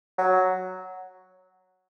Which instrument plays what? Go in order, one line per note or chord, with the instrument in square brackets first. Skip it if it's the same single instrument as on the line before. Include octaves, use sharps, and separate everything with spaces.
[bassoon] F#3